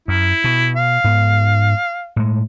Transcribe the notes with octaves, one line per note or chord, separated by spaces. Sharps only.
F#2 E4
B2
F5
G#2 B3
A2 G#3